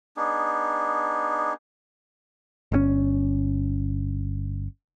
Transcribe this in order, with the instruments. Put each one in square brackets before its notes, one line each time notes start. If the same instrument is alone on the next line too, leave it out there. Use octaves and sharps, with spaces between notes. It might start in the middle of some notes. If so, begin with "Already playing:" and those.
[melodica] B3 D4 D#4 G#4
[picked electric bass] G1 C3 C#4